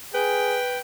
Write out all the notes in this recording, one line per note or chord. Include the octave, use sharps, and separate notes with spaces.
G#4 B4 G5